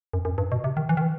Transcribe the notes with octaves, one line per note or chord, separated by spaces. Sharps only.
F#2
F#2
G2
B2
C3
D#3
E3
D#3
E3